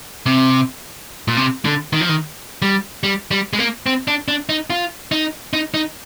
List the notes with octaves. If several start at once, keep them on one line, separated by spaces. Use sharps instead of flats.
C3
A#2
C3
D3
D#3
F3
D#3
G3
G3
G3
G#3
A#3
C4
D4
D4
D#4
F4
D#4
D#4
D#4